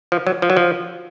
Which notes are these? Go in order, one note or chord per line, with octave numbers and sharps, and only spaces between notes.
F3
F#3
F3
F#3
F3